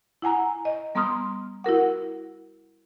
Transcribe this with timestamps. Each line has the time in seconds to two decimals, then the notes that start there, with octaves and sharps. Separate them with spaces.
0.22 E4 F#5 G#5 A#5
0.65 D#5
0.95 G3 B3 A#5 C6 D#6 F6
1.64 E4 F#4 A#4 F#5